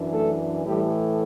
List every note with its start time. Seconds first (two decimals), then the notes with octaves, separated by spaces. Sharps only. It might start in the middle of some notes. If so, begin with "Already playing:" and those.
Already playing: F#2 E3 D4
0.13 A3 A4
0.66 A2 E3 G3 A3 G4